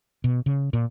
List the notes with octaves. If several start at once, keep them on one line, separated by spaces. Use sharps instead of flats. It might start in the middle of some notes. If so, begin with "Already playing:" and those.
B2
C#3
A#2